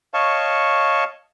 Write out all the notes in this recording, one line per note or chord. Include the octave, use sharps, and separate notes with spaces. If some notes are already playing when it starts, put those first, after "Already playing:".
C#5 D#5 F5 A5 C#6